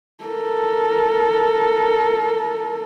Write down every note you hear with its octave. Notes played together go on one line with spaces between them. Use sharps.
A4 A#4